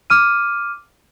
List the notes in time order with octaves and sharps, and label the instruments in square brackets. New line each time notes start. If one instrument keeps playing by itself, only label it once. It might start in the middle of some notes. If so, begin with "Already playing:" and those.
[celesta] D6 F6 D#7